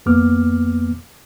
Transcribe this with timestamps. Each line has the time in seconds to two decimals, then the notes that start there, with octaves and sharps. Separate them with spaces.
0.06 F2 A#3 B3 D6 F6